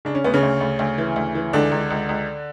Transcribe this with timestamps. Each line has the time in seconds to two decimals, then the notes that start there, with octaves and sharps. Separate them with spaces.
0.05 C#3 D4
0.15 C#4
0.24 D2 B3
0.34 C#3 C#4
0.43 D2
0.60 D2
0.79 D2
0.98 E3
1.16 D2
1.35 E3
1.53 C#2 D3 D4
1.71 C#2
1.90 C#2
2.09 C#2